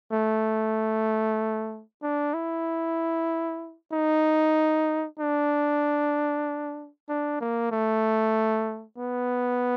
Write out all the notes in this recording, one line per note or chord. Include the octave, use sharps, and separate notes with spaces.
A3
D4
E4
D#4
D4
D4
A#3
A3
B3